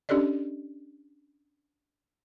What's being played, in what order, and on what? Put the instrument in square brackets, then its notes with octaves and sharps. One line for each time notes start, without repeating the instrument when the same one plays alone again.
[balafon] C#4 D4 G4 A4 D5 D#5